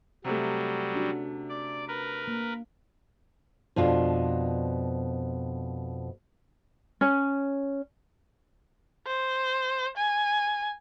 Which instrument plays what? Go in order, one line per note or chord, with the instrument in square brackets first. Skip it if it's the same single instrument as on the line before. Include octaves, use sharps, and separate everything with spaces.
[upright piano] C3 A3 [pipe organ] F#3 G3
[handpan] C#4 D4 F#4
[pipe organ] D5
A#4 B4
[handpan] A#3
[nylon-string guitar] F2 B2 D4 F4
[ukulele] C#4
[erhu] C5
G#5